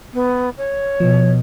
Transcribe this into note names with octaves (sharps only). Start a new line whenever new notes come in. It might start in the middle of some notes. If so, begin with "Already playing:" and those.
B3
C#5
B2 F3